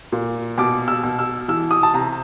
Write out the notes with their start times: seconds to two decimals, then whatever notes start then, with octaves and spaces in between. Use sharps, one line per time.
0.12 A#2
0.58 B2 D6
0.88 E6
1.03 B2
1.19 E6
1.48 E3 E6
1.71 D#6
1.83 A5
1.94 C3 A#5